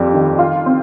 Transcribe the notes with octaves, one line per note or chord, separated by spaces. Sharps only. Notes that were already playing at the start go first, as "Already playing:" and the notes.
Already playing: F2 G3 C4
D#3
F4
C4